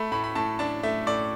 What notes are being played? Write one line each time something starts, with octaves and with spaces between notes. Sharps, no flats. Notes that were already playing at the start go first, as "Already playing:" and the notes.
Already playing: A3 B5
A2 B5
B5
A2 A5
D4 A5
A3 E5
A2 D5